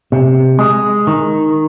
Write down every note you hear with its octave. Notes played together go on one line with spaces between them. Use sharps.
C3
G#3
D#3